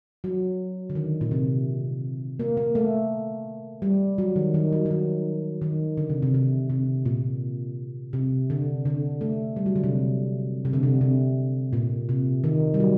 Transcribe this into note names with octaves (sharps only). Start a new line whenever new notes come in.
F#3
D3
D#3
A#2
C3
A#3
A#3
A3
G3
F#3
D#3
D#3
F#3
F#3
D#3
D#3
D3
C3
C3
C3
C3
A#2
C3
D3
D3
A3
G3
F#3
D3
C3
C3
D3
C3
C3
A#2
C3
D#3
G3
F#3